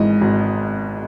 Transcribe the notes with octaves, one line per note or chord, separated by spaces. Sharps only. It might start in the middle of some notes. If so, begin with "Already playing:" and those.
Already playing: G#1 G#2 E3 D#5
G#1